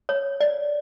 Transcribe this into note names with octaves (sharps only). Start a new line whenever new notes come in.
C#5
D5